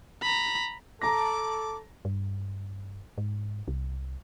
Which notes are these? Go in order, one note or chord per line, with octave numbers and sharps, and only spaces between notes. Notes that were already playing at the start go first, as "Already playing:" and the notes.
A#5 B5
A4 A5 A#5 D6 A#6
G2
G#2
C2